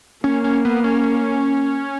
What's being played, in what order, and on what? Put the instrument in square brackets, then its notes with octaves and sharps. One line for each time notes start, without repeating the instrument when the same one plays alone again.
[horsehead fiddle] A#3 [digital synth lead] C#4
[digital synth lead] C#4
B3
C#4